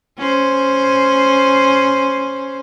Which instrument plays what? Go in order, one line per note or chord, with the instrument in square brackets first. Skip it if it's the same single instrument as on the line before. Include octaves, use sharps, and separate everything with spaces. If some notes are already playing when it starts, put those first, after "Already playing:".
[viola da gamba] C#4 C5